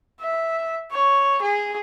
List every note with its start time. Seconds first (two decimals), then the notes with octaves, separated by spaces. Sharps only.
0.21 E5
0.92 C#5
1.42 G#4